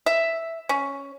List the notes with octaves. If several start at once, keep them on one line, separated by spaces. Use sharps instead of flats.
E5
C#4